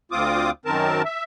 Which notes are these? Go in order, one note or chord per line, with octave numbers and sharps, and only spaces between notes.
D2 C4 F4 D6 D#6
F#2 D#3 C4 A#4 A5
E5